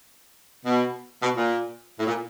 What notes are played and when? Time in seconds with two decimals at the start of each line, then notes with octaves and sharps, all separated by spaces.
0.66 B2
1.22 B2
1.37 A#2
1.99 A2
2.07 A#2